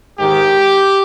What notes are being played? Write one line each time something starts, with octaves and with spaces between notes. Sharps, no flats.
G#2 D#3 G4